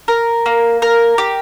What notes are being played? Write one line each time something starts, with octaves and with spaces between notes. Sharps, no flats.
A#4
A#3
A#4
G4